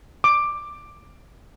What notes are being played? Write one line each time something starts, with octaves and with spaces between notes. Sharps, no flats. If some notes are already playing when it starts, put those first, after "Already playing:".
D6